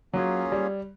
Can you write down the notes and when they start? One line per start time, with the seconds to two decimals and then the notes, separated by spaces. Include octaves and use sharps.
0.13 F#3 A#3 C#4 F4 G#4 C#5
0.52 G3